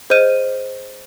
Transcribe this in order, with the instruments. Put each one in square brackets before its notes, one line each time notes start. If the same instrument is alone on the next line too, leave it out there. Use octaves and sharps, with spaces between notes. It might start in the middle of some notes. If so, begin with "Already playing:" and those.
[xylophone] G#4 C5 D#5 F6 G6 D#7